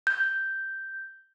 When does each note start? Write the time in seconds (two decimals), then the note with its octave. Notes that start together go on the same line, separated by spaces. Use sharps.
0.07 G6